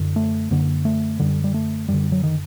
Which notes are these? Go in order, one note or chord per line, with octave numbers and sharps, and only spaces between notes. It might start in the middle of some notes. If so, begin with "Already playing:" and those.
Already playing: F#2 D3
A3
F#2 D3 A#3
A3
F#2 D3 G3
G3
A3
F#2 D3 G3
F#3
D#3